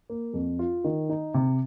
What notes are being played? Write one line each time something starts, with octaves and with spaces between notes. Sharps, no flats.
A#3
F2
F4
D#3
D#4
C3